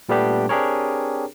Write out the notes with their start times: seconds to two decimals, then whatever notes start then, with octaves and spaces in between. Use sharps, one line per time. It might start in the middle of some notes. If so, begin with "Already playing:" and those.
0.09 A#2 G3 A3 B3 D4 G4
0.49 C4 D4 G4 G#4 A#4 C#5